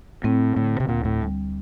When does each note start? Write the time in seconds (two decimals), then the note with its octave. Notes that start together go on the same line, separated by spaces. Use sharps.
0.24 A2 C4
0.56 A2 D3
0.80 C3
0.89 D2 A#2
1.05 A2
1.21 G3